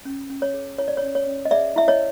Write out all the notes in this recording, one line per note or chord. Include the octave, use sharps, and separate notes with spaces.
C#4
C#4
C#5
G#4
E4 C#5
D5
C#5
C#4
C#5
C#4
D#5
G#4 D5 E5
E4 E5
C#5 D#5